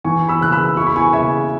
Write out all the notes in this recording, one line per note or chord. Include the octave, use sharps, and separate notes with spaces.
E3 G#5 C#6
B5 E6
C#3 F#6
B5 E6
E4 C#6
B5
G#5 C#6
C#3 E5 G#5